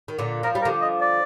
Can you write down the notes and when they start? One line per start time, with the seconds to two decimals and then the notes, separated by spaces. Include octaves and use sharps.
0.08 D#3
0.19 A#2 D3
0.43 F3 A#4
0.55 G3
0.62 A#4
0.65 D3 F3
0.82 D#5
1.01 D5